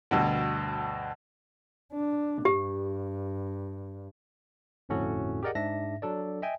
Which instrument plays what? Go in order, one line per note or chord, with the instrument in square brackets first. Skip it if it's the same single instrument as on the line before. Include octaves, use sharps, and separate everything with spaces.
[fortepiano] D2 G2 B2
[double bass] D4
[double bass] G2 [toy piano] G4
[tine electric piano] G1 F2 A2 C#4 F#4 A4
G4 G#4 A#4 D5 D#5 F#5
G#2 D4 E5 A#6
F#3 D4 A4 D5
D#5 E5 G5 G#5